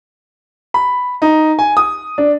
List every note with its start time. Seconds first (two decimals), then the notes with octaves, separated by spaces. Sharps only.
0.74 B5
1.22 D#4
1.59 G#5
1.77 D#6
2.18 D4